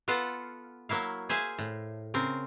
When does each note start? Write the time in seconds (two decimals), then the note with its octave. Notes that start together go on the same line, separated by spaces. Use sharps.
0.08 B3 F4 A4 F5 F#5
0.89 F#3 A#3 E4 F5
1.29 G#4 C5 E5 F5 G#5
1.58 A2
2.14 C#3 C4 A#4